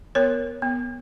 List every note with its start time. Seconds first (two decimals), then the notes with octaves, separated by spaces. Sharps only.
0.15 B3 A#4 C#5
0.62 B3